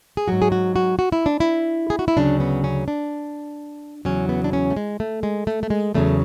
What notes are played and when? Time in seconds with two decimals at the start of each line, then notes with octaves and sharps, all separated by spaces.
0.17 G#4
0.28 G#2 F#3 F#4
0.42 G#4
0.52 F#4
0.76 F#4
0.99 F#4
1.12 E4
1.26 D4
1.40 E4
1.90 G#4
1.99 F#4
2.08 E4
2.17 D2 C#3 F#3 D4
2.40 B3
2.64 C#4
2.88 D4
4.05 E2 C#3 F#3 C#4
4.29 B3
4.44 D4
4.53 C#4
4.70 A3
4.77 G#3
5.00 A3
5.23 G#3
5.47 A3
5.63 A3
5.70 G#3
5.94 E2 C#3 F#3 A3